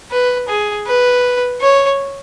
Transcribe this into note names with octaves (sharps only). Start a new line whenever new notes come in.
B4
G#4
B4
C#5